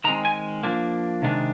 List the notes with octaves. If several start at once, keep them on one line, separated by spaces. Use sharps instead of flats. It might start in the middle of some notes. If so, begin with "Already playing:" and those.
D#3 G#3 C4 A#5
G#5
F3 A#3 D4
C3 D#3 G#3 D4